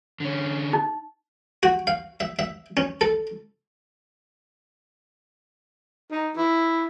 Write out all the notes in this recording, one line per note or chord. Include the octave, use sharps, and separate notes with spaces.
D3 C#4
D#4
F#4
F5
E5
E5
C#4
A4
D#4
E4